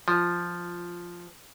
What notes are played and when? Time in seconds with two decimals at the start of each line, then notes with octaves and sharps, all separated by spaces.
0.08 F3